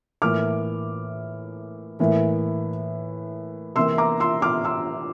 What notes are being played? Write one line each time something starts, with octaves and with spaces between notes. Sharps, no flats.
A2 E3 A#3 D6 F6
A2 E3 A#3
C3 E3 A#3 C6 E6
A#5 D6
C6 E6
D6 F6
C6 E6